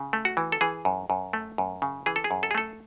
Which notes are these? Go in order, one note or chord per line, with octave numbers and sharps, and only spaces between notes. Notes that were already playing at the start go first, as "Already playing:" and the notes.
Already playing: C#3
A3
F#4
E3
A4
E3 G#4
F#2
F#2
A3
F#2
C#3
E3 G#4
A4
G#4
F#2
A4
G#4
A3 A4